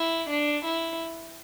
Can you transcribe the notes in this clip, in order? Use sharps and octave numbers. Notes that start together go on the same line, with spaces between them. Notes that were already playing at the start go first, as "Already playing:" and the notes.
Already playing: E4
D4
E4